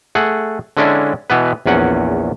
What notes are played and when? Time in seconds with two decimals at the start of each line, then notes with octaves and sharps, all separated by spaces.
0.15 A3 G#4 F#5
0.77 D3 G#3 C#4 D4 E4
1.30 B2 E3 B3 B4
1.66 A#1 E2 C#4 F#5